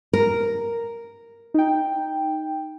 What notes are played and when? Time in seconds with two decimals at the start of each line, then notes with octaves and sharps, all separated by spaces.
0.13 A#4
1.54 D#4 G5